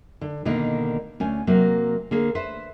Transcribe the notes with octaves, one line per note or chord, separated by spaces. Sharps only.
D3
B2 D3 D#3 A#3 D#5
D2 C#4 G#5
C3 F#3 A#3
D3 A#3 G#4
B4 C5 E5